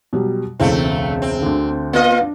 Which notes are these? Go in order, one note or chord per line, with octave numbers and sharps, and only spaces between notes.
B2 F#3 G3
E1 C#2 A3 C4 E4
C4
D2 D3
A#3 F4 D#5
D4